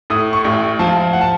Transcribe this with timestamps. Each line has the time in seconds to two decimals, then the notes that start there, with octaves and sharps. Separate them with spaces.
0.10 A2 D#6
0.33 C#6
0.44 A1
0.79 F3 A5
1.13 F#5
1.21 A5